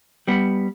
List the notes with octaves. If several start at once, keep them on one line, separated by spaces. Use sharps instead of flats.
G3 B3